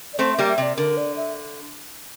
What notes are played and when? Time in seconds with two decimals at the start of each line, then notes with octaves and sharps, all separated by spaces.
0.14 D5
0.19 A3 C4 C5
0.33 E5
0.38 G3 A#3
0.48 E5
0.58 C3 D5
0.77 D3 A#4
0.97 D5
1.16 E5